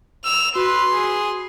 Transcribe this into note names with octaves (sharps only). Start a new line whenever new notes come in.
E6 F7
F#4 B4 C6
G#4